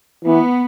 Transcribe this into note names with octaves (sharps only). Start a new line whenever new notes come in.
E3 B3